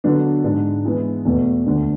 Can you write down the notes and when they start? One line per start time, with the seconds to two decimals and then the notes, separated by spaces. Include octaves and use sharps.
0.04 D3 F#3 B3 D4
0.44 G#2 G#3 D4
0.85 E3 G#3 B3 E4
1.25 E2 B2 A3
1.66 D2 D3 A3 D4